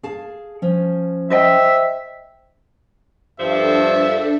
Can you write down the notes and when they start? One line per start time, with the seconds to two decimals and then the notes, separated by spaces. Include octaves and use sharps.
0.03 G#4 F5 A5
0.62 F3 C#4
1.30 C5 D#5 E5 G5
3.40 G2 F3 D4 A4 E5